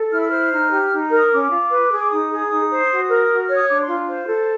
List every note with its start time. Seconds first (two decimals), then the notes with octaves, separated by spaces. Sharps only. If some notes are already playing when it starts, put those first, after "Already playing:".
Already playing: A4
0.12 E4 F6
0.21 E6
0.28 C5 F6
0.51 D#4
0.71 G4
0.91 D#4
1.11 A#4
1.18 D#6
1.31 C#4 D6
1.51 F4
1.71 B4
1.91 G#4
1.99 D6
2.11 D#4 D#6
2.31 G#4
2.50 D#4
2.71 C5
2.90 F#4
3.09 A#4
3.30 F#4
3.43 F6
3.49 C#5
3.56 D#6
3.69 D4 D6
3.83 C6
3.89 F4
4.08 C5
4.29 A4